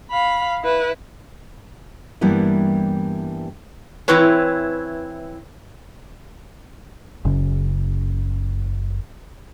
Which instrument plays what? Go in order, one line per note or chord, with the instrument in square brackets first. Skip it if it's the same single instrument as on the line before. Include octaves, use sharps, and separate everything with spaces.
[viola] F5 B5
E4 B4
[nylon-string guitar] G2 E3 G3 A#3 B3 E4
[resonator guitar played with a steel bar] E3 C4 E4 B4 C#5
[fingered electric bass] F#1 C#3